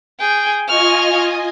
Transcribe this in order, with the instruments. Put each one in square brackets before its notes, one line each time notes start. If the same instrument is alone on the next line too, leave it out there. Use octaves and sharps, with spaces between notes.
[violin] G#4 G5
[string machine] F4 D#5 G#5 [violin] C#6 F6